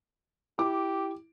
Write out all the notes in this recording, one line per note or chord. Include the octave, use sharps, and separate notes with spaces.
E4 G4 D6